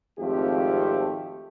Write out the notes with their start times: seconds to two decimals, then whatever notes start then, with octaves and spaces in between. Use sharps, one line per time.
0.19 G#1 F2 F3 A3 G4